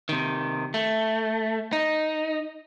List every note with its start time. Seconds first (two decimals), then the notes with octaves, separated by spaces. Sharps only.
0.09 C3 D#3
0.74 A3
1.73 D#4